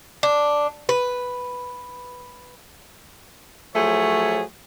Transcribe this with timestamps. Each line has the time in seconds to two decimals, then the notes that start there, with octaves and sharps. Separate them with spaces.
0.23 D4
0.89 B4
3.75 F3 F#3 A3 G#4 C#5